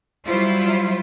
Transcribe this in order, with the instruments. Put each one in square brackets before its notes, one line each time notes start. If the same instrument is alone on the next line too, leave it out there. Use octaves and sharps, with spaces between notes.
[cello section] F#3 G3 E4 F4 C5